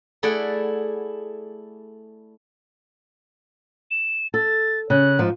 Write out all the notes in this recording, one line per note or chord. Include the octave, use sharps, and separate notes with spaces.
A3 E4 G#4 D5 E5 F#5
E7
A4 A6
C#3 F#6
G#2 F3